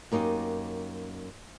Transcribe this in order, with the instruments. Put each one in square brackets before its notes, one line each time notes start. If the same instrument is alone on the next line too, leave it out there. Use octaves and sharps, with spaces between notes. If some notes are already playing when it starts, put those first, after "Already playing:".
[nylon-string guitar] F#2 A#3 D#4 G4